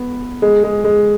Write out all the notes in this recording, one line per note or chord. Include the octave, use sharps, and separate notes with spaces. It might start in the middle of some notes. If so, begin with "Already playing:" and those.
Already playing: B3
G#3
G#3
G#3